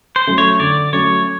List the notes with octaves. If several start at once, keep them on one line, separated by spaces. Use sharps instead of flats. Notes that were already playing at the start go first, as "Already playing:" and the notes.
C5
F#3 A3 C#4
C#5
D3 D5
F#3 A3 C#4 C#5